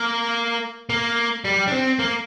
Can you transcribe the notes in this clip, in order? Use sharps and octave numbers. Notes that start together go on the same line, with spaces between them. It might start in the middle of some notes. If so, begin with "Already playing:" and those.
Already playing: A#3
A#3
G3
D4
C4
A#3